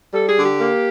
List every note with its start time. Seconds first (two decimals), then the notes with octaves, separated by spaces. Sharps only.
0.14 G3 A4
0.29 G#4
0.37 D3
0.44 G4
0.59 A#3